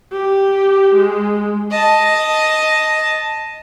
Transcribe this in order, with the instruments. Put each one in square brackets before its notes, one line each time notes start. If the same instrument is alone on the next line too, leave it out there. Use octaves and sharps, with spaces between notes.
[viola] G4
G#3
[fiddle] D#5 A5